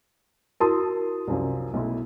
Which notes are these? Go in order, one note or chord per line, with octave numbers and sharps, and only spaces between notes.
E4 F#4 A#4 A5 C6 D#6
C2 F#2 F3
B1 A3 E4